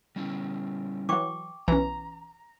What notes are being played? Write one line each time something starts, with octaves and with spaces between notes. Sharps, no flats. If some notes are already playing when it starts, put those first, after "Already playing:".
G3 C#4 E4
E3 F#3 G5 C#6 D6
B1 E3 C#4 A#5